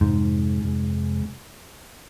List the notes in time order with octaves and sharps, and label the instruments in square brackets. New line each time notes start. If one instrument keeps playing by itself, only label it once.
[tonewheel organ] F2 C3 G#3 [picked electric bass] G#2
[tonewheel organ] F2 C3 G#3